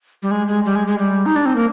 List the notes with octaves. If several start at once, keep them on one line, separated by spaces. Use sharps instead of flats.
G3
G#3
G#3
G3
G#3
G#3
G3
D#4
D4
C4
A#3